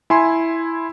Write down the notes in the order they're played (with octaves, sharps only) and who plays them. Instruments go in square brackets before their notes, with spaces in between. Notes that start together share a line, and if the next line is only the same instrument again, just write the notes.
[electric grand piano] E4 G#5 C6